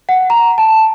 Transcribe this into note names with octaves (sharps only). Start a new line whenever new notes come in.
F#5
A#5
A5